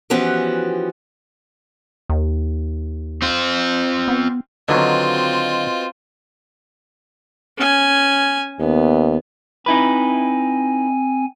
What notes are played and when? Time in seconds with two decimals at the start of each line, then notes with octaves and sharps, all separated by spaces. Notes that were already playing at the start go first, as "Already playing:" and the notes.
0.10 E3 F3 B3 C#4 F#4 G4
2.09 D#2
3.22 C4 F4
4.08 B3
4.69 D3 D#3 F#3 C4 F4 F#4 B4 D#5
7.57 C#4 G#5
8.60 D#2 B3
9.66 C4 D#4 E4 B4 G#5